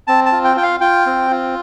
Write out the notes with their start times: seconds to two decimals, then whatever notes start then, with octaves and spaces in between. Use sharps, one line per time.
0.07 C4 A5
0.26 A5
0.32 F4
0.44 G5
0.56 F4 G5
0.63 F5
0.81 F4 G5
1.06 C4
1.31 F4